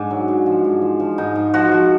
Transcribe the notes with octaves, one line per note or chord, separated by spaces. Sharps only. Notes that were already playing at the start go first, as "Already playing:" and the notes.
Already playing: G#2 D4 G#4
F#3
G#2
F3
G#2
F3
F3
G#2 D#4
G#2
F3 F#4
F3